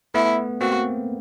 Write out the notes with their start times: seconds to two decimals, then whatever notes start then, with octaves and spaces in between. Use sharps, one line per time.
0.14 A3 B3 E4
0.61 A#3 C4 F#4